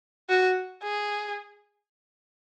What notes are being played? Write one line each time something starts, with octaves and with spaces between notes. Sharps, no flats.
F#4
G#4